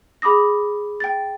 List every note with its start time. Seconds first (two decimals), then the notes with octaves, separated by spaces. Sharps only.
0.22 G#4 B5 D6 D#6 A#6
1.00 G5 A6